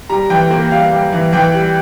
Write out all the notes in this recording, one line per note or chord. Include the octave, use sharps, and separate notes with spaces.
G3 A#5
E3 G5
A#3
G3 F5
G3
E3
E3 G5
G3